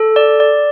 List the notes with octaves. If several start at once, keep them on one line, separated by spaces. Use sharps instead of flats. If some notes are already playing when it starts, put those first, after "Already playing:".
Already playing: A4
D5
D5